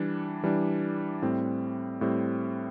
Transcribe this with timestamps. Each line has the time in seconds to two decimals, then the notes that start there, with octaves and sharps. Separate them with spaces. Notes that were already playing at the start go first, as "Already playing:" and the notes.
Already playing: E3 G3 D4
0.43 E3 G3 D4
1.22 A2 G3 C4
2.01 A2 G3 C4